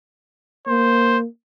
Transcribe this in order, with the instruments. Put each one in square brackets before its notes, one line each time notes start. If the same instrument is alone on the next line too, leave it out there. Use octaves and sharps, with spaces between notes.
[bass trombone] A#3 [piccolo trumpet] C5